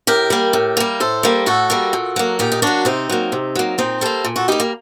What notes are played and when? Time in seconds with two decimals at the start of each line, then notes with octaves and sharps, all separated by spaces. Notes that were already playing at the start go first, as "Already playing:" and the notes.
0.07 A2 G4 A#4
0.30 G3 A#3
0.53 A2
0.77 G3 A#3
1.00 A2 A4 C5
1.23 G3 A#3
1.46 A2 F#4 A4
1.70 G3 A#3
1.93 A#2
2.16 F#3 A#3
2.39 A#2 D#4 G4
2.52 D#4
2.62 F#3 A#3 D4 F#4
2.85 C3 C4 D#4
3.10 F#3 A#3
3.32 C3
3.55 F#3 A#3
3.78 A#2 C4 D#4
4.01 G3 A#3 A4 C5
4.25 A#2
4.36 F#4 A4
4.48 G3 A#3 D#4 G4
4.60 A#3